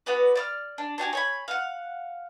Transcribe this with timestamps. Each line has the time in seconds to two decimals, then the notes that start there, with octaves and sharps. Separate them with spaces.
0.06 B3 F#4 B4 D5
0.35 D5 E6 F6
0.78 D4
0.98 D4 F#4 G4 G#5
1.13 C#5 G#5 B5
1.48 F5 F#5